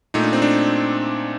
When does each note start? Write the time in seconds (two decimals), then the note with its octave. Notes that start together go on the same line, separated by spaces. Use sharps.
0.14 A#2 A3 D#4
0.23 D4
0.33 C4
0.42 D4